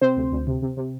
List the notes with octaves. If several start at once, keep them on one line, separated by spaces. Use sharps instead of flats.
C3 C4 C5
D2
D2
C3
C3
C3